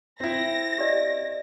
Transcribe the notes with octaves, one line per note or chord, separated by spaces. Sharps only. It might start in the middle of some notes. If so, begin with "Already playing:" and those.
C4 E4 A#6
G4 D5 D#5